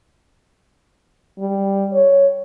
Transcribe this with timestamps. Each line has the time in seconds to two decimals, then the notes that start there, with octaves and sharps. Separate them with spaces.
1.39 G3
1.93 C#5